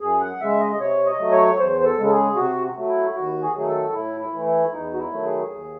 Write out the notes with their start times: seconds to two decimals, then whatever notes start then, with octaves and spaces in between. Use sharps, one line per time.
0.01 F#2 G#4
0.20 F#5
0.40 C#3 G#3 E5
0.59 D#5
0.72 D#5
0.80 C3 C#5
1.06 D#5
1.19 F#3 A3
1.32 C#5
1.59 E2 C5
1.80 C5
1.85 A4
1.98 C#3 G#3
2.06 A4
2.10 G#4
2.36 C3 F#4
2.76 F#3 A3
2.88 E4
3.15 D#2 F#4
3.42 G#4
3.55 D#3 F#3 A3 G#4
3.67 A4
3.93 A2 E4
4.20 E4
4.33 E3 A3
4.46 E4
4.72 E2 D#4
4.93 F#4
4.98 E4
5.11 D#3 F#3 A3
5.25 G#4
5.51 D#2